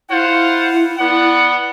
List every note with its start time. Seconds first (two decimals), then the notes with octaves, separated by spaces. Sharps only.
0.10 E4 F4 C5 F#5
0.98 B3 D5 F#5